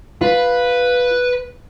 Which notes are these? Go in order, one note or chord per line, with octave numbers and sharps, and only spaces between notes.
F4 B4